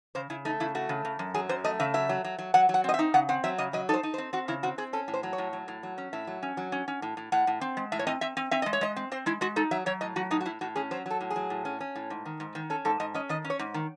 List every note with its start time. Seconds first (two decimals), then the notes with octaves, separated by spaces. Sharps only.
0.15 C#3 C5
0.30 C#3 E4
0.45 A3 D#4
0.60 C#3 E4
0.75 A3 F#4
0.89 C#3
1.05 C#3
1.19 F#2
1.34 F#3 G#4
1.49 F#2 C5
1.64 A3 D#5
1.79 C#3 E5
1.94 F#3 E5
2.09 F#3
2.24 F#3
2.38 F#3
2.54 F#3 F#5
2.69 F#3
2.74 F#5
2.84 C4 D#5
2.94 E5
2.99 D#4
3.14 C#3 F#5
3.29 C4 F#5
3.44 F#3 E5
3.58 C#3 D#5
3.73 F#3 D#5
3.89 D#4 A4
3.94 C5
4.03 D#4
4.14 C5
4.18 C4
4.33 C4 F#4
4.48 C#3 E4
4.63 C4 F#4
4.78 C4 G#4
4.93 C#4 A4
5.08 A2
5.14 C5
5.23 F#3
5.33 C#5
5.38 A2
5.53 F#3
5.68 A2
5.83 F#3
5.98 C#4
6.13 A2 E5
6.27 F#3
6.43 C#4
6.57 F#3
6.72 C#4
6.88 C#4
7.02 A2
7.17 A2
7.32 A2 F#5
7.47 A2
7.61 C4
7.77 G#3
7.92 A2 E5
7.99 C#5
8.07 C4 D#5
8.21 C4 E5
8.37 C4
8.51 C4 E5
8.62 G#3 D#5
8.73 C#5
8.81 G#3 D#5
8.96 C4
9.12 C4 C5
9.26 G#3 E4
9.41 G#3 F#4
9.56 D#4 A4
9.71 F#3 E5
9.86 F#3 C#5
10.01 A2 D#5
10.16 F#3 F#4
10.31 A2 D#4
10.41 F#4
10.45 A2 E4
10.61 A2 F#4
10.75 C#4 G#4
10.91 F#3 C5
11.06 F#3 A4
11.21 A2
11.30 G#4
11.36 F#3
11.50 A2
11.65 C#4
11.81 C#4
11.96 A2
12.10 G#2
12.25 D#3
12.40 G#2
12.55 D#3
12.70 C#4 A4
12.85 G#2 A4
13.00 G#2 D#5
13.14 C#4 D#5
13.29 D#3 D#5
13.45 C#4
13.50 C#5
13.59 G#2
13.74 D#3